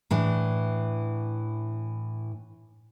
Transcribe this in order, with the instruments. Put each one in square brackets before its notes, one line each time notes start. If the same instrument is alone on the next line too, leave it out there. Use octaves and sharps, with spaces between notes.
[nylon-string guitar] A2 E3 D4